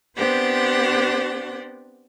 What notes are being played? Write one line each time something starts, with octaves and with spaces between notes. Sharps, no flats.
B3 C4 D4 G4 C5 F#5